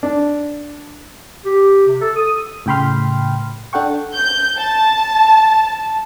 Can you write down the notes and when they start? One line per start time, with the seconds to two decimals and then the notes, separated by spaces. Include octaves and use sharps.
0.03 D4
1.44 G4
1.87 C3
2.01 A4
2.16 D#6
2.66 A2 C#3 G5 B5 C6 F6
3.73 D4 A4 F#5 G5 C#6
4.15 G6
4.58 A5